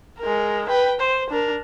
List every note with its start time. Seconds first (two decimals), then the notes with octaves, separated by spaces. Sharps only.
0.20 G#3 A#4
0.69 B4 G5
1.00 C5
1.30 D4 A#4